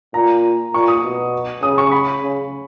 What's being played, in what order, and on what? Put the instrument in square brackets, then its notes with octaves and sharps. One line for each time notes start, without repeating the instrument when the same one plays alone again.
[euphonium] A#2 [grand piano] A#5
[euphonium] A#2 [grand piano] C#6
[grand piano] D#6
[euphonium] B2
[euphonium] C#3 [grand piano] D#6
[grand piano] C#6
B5
[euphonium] C#3